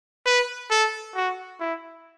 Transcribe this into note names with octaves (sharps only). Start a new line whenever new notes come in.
B4
A4
F#4
E4